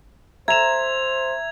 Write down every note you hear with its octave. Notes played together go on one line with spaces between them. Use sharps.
C5 E5 A#5 G#6 E7 F7